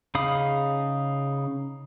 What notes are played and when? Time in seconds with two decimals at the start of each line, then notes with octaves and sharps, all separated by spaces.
0.15 C#3 D#4 F5 B5 D#6